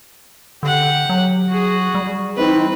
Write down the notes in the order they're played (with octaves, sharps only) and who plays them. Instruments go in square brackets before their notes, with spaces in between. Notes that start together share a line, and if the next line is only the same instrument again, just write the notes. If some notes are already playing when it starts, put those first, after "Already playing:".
[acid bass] D3 [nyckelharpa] G4 F#5
[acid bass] F#3
[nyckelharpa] F#4 G#4
[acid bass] G3
[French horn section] E3 C4 D#4 [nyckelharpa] B4